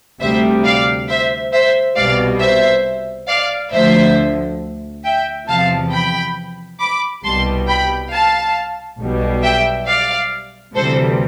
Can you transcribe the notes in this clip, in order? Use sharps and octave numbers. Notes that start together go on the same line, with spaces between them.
D2 C3 G3 C5 E5
D5 F5
C5 E5
C5 E5
C2 B2 G3 D5 F5
C5 E5
D5 F5
D2 D3 F3 C5 E5
E5 G5
E2 C3 F3 F5 A5
G5 B5
B5 D6
C2 B2 G3 A5 C6
G5 B5
F5 A5
B1 B2 G3
E5 G5
D5 F5
D2 C3 E3 G3 A4 C5